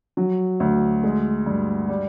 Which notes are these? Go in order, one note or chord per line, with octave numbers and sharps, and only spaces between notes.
F#3
D2
G#3
G2
G3